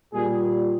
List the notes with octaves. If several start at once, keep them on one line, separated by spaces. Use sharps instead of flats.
A#2 G3 G#4